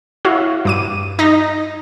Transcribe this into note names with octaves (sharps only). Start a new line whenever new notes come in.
E4 F#4 C#5 F5
G2 D6 D#7
D#4 A#6